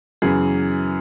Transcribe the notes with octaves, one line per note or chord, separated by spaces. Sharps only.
F#2 C#3 E3 B3 G#4